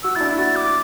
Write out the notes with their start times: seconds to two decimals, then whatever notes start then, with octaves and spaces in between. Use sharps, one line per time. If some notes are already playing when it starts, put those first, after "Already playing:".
0.04 F#4 E6
0.15 E4 A6
0.21 D4
0.29 E4
0.38 F#4 A6
0.56 D6